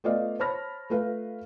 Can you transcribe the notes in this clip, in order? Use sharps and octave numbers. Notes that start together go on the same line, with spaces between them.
A3 B3 F4 D5 D#5 F5
C5 C#5 A5 B5 F6 A#6
A3 F4 B4 F5